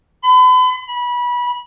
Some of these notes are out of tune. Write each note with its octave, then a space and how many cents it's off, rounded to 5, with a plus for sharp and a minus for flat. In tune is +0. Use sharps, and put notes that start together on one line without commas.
B5 +40
B5 -25